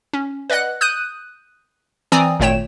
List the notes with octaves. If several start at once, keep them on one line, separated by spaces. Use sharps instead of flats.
C#4
B4 D5 D#5 F#5 F#6
D#6 F#6 G6 D#7
E3 C4 D5 G#5 A#5 D#6
G#1 A#2 A3 C#5 G5 E7